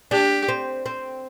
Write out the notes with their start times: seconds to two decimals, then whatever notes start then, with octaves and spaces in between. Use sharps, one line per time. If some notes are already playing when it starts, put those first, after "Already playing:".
0.11 D4 G4
0.48 C4
0.86 C4